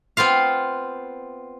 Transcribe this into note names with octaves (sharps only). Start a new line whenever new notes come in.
B3 C4 F4 F5